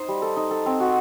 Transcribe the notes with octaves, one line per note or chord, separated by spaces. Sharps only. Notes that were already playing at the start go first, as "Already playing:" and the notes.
Already playing: D#4 C5 D#5
G3
A4
D#4
A4
C4
F#4